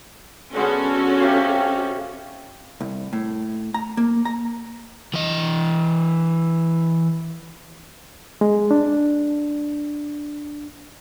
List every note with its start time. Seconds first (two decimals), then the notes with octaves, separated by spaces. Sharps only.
0.54 D3 G#3 B3 C#4 F#4 A4
1.20 C3 G4 F5
2.81 C2
3.13 A2
3.74 A#5
3.97 A#3
4.25 A#5
5.14 E3 D#5
8.41 G#3
8.71 D4